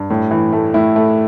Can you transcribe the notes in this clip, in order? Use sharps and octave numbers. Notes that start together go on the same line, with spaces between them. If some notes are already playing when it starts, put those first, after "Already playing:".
Already playing: G2
A2
E3
A3
A2 E4
A3